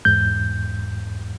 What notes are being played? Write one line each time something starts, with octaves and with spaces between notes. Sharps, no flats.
E2 G#2 G6